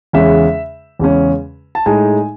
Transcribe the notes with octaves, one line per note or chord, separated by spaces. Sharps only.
E2 C#3 G#3 C#4 E5
E2 C#3 G#3 C#4
A5
A2 G#3 D#4 G#5